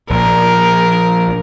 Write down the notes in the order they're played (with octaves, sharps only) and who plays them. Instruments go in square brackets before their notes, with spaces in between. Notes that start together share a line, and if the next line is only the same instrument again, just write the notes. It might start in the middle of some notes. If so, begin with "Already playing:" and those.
[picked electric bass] A#1 [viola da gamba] A#4